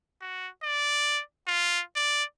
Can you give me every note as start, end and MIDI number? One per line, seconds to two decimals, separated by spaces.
0.21 0.48 66
0.63 1.21 74
1.47 1.81 65
1.96 2.24 74